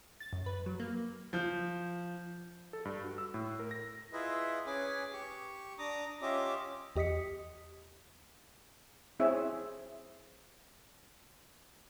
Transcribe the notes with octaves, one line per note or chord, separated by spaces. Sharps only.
A6
F#2
B4
F#3
A#3
F3 G6
A4
G2
F#4
E6
A2
A#4
A#6
E4 F4 G#4 B4 D#5 E5
C#4 G#4 B4 G#5 D6
G4 C#6
D4 A#5 D6 D#6
C#4 F4 G4 D#5 E5 D6
E2 G4 D#5 D#6 B6 C#7
C4 E4 G#4 C#5 E5